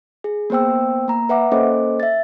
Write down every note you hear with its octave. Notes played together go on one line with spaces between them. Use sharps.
G#4
A#3 B3 C5 G5 E6
A#3 A#5
B4 E5 F#5 D6
A#3 C#4 A4 C5 D#5 D6
E5 A6